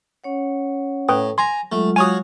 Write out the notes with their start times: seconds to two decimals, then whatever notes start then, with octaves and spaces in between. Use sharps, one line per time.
0.24 C#4 C#5 F#5
1.09 A2 B4 G5 D#6
1.38 G#5 A#5 C6
1.72 F#3 G#3 A3 F4
1.96 F#4 C#5 F5 G#5 D#6